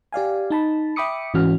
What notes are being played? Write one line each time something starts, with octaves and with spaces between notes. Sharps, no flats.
G4 D5 F5 G#5
D#4 A5 B5
E5 G5 B5 D6 D#6 C#7
G#2 E3 C#4 F#4 F6